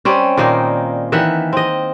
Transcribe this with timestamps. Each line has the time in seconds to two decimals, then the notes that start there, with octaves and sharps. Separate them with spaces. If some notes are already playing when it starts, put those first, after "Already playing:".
0.05 G3 C4 C#4
0.37 A#2 D#3 A#3 D#4
1.12 D#3 E3 E5 F#5
1.53 C4 D#5